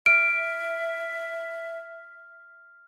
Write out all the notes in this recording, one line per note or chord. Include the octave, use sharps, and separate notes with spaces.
E5 F6 D7